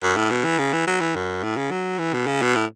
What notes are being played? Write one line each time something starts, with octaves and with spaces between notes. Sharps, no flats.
F#2
A2
B2
E3
C#3
E3
F#3
E3
F#2
A2
C#3
F#3
E3
B2
C#3
B2
A2